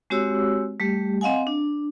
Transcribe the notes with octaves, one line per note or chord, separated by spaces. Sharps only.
G#3 C4 F#4 G4 C#5 E6
G3 A3 G4
C4 D#5 F5 F#5 G#5
D4